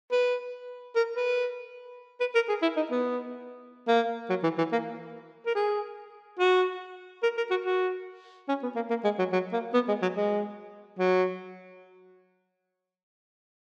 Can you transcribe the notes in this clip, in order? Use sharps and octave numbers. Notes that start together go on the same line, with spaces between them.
B4
A#4
B4
B4
A#4
G#4
E4
D#4
B3
A#3
F#3
E3
E3
A#3
A#4
G#4
F#4
A#4
A#4
F#4
F#4
C#4
B3
A#3
A#3
G#3
F#3
F#3
A#3
B3
G#3
F#3
G#3
F#3